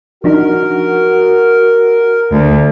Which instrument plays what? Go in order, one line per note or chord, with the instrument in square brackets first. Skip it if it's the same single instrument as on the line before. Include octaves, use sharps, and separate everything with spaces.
[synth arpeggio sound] F3 D4 D#4 [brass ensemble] F#4 [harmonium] A#4
[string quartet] D2